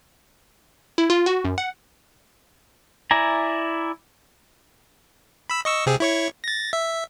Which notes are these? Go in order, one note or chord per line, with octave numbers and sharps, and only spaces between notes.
E4
F4
F#4
F#2
F#5
E4 D5 G#5 A#5
B5 E6
D#5 C#6 E6
C3 C4 G#4
E4 C#5 C#6
A6 A#6
E5